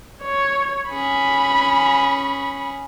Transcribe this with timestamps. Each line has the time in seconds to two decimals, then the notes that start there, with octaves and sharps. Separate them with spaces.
0.23 C#5
0.91 C#4 G#4 B5